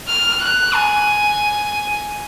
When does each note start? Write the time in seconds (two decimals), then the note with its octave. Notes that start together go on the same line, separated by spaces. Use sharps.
0.08 F6
0.42 F#6
0.75 G#5